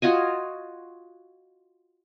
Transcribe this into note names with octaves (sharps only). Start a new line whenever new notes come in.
F4 F#4 D#5 G#5